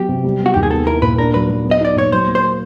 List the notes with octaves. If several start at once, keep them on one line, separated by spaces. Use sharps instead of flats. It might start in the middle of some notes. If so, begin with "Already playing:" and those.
Already playing: F#3 B3 G4
C3
G3
B3
F#4
D#2 G4
G#4
B3 A4
E4 A#4
A#2 B4
D4 A#4
F#3 B4
F#3
B3
D#5
D#4 D5
A#2 C#5
F#3 C5
A#3
C5